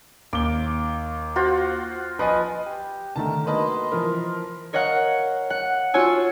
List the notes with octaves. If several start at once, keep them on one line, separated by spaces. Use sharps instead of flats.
D#2 D6 G7
F4 F#4 C5
F3 B4 D#5 G#5
G4
D3 D#3 A3 A#4 A5
F#3 A#3 B4 D#5 A5 C6
E3 F3 A#4
A#4 C#5 D#5 F5 F#5
F#5
F4 F#4 C#5 G#5 E6